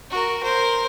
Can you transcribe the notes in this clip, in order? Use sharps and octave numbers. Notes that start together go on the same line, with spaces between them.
F#4 A#4
A#4 C5